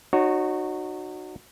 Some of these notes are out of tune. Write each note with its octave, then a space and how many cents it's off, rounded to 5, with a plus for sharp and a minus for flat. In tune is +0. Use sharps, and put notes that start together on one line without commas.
D#4 -35 F#4 +0 C#5 -15